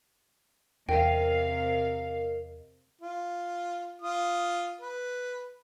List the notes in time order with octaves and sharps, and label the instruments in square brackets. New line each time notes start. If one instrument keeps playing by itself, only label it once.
[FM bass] E2 [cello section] C3 F5 [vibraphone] A#4 D#5 [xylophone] G5
[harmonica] F4
F4 D#6
B4